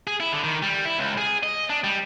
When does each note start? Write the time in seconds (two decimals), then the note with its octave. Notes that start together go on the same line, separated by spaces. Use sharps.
0.07 G#4
0.20 E4
0.33 D3
0.44 D#3
0.62 G3
0.85 E4
0.98 C#2
1.18 G#4
1.43 D#5
1.69 D4
1.84 G3